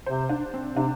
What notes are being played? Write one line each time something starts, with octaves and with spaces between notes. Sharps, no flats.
C3 C5
D4
C4
C3 D4